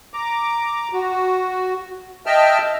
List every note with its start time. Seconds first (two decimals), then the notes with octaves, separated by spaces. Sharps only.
0.14 A#5 D6
0.93 F#4
2.26 D#5 E5 G5 A5 E6 F6